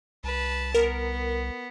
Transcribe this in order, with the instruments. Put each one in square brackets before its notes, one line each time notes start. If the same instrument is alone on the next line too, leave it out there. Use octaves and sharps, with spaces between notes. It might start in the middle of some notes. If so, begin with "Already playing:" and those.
[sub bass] C2 [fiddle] B4 A5
[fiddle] B3 [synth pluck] A#4